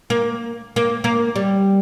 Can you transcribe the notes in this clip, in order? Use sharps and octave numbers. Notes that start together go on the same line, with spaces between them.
A#3
A#3
A#3
G3